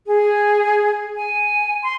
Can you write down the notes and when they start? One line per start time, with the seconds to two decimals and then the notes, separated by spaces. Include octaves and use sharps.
0.07 G#4
1.15 G#5
1.83 C6